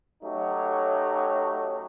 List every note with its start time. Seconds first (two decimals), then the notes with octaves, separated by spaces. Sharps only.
0.24 F#3 A3 C#4 D#4 G4